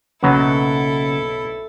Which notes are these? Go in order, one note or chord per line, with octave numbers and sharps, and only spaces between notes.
B1 C#3 F#3 A#3 B3 C#4 E4 A4